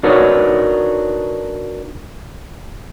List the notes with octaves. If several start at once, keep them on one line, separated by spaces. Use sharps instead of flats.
D4 D#4 F#4 A#4 B4 C#5